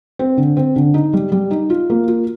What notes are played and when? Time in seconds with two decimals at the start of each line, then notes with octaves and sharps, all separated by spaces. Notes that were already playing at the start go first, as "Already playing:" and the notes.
0.19 C4
0.37 D3
0.57 C4
0.76 D3
0.94 D#4
1.14 G3
1.32 G3
1.51 D#4
1.70 F4
1.90 A#3
2.08 F4